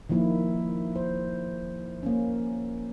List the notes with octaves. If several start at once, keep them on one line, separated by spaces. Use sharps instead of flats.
D#3 F3 A#3 E4
C5
A#3 C#4